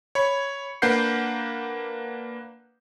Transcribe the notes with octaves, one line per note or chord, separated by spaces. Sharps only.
C#5 B5
A#3 D4 B4 F#5 G6 C7